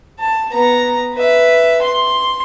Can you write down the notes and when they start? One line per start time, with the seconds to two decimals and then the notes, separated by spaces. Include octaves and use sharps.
0.20 A5
0.52 B3 A#5
1.14 B4 E5
1.82 C6